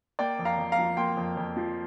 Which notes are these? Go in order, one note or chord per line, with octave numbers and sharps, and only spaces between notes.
A#3 D5 G5
F2
F5 A#5
F2
F5 A#5
F3
A#3 G5 C6
F2
F2
F3